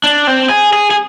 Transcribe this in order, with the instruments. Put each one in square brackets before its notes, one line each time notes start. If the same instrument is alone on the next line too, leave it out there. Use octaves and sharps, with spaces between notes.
[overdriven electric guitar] D4
C4
G#4
G#4
G#4